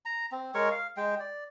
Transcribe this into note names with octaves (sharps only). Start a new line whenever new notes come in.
A#5
C4
G#3 A#4 C#5 C#6
F5
G#3 G5
D5